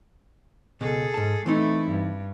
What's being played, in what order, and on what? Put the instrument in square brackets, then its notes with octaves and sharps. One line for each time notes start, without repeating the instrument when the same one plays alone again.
[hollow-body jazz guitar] C#2 B2 [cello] G#4 A4
[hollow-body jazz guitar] G#2 A5
[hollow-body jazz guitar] E3 C4 D#4 [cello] A3 E4
[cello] G2